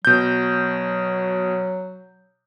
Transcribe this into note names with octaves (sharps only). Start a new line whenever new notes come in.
B2 F#3 G6